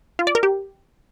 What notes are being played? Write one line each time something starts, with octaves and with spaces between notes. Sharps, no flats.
F4
D5
A#4
G4